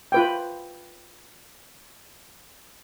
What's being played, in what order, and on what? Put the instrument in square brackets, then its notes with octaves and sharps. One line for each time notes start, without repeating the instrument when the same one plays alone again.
[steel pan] F4 B4 G5